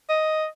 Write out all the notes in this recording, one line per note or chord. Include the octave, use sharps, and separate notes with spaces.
D#5